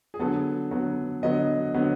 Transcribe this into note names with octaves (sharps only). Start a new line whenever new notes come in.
G#4
D3 F#3 B3 A4
D3 F#3 B3
D3 F#3 B3 D#5
D3 F#3 B3